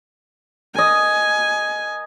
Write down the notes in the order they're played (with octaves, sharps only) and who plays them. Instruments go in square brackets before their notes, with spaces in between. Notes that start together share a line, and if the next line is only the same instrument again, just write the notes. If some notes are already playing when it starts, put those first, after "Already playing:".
[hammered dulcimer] A#4 D#5 [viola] G#5